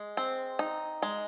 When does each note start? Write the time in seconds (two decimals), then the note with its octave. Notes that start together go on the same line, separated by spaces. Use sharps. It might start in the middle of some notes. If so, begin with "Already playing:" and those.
Already playing: G#3
0.17 C4
0.59 D#4
1.02 G#3